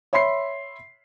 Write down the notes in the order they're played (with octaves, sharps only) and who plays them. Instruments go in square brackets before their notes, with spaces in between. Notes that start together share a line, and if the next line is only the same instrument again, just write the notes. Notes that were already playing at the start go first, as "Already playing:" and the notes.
[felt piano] C#5 E5 B5 C6 C7